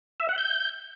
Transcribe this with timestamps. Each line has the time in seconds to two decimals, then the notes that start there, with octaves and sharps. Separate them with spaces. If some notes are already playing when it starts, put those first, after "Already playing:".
0.20 E5
0.29 F#5
0.38 G6